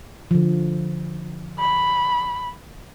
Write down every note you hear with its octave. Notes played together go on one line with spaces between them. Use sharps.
D3 F3
B5